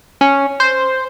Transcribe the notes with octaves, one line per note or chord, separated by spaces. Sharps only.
C#4
C5